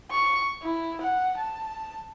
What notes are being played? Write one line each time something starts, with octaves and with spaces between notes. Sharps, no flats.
C#6
E4
F#5
A5